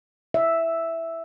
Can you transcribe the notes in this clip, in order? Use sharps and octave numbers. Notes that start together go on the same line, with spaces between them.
E5